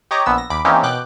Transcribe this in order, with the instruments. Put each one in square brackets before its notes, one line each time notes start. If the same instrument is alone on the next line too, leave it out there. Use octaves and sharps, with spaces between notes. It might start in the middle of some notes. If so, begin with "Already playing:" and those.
[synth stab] G4 C#5 D#5 A#5 D6
A#1 B3 E6
A#6
D#2 B5 D6 D7
E3 A#3 C4 C#4 D#4 G4
B2 G5 D6 F#6